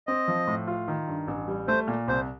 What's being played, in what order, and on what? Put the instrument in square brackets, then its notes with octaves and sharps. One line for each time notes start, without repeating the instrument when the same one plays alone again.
[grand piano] C4 [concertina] D#5
[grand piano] F3
A2
F4
D#3
G2
A1
G3
[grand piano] A3 [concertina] C5
[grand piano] A#2
[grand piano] C2 [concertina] C5